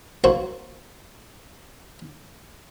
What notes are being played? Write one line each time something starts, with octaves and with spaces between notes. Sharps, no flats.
A#3 F#4 C5